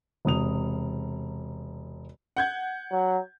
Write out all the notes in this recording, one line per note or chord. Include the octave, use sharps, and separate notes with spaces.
E1 C3 D#6 F7
F#5 G6 G#6
F#3